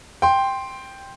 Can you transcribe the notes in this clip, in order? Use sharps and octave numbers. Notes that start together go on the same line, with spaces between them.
G5 C6